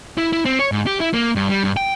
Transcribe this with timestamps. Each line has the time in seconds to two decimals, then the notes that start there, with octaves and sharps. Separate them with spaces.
0.18 E4
0.33 E4
0.45 C4
0.59 C#5
0.72 G#2
0.86 G4
1.00 E4
1.13 A#3
1.35 G2
1.49 G3
1.64 G2
1.77 G5